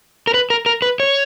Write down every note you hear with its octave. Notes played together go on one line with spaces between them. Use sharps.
A#4
B4
A#4
A#4
B4
C#5